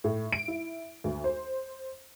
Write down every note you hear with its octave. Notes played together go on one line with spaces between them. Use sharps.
A2
D7
E4
D2
C5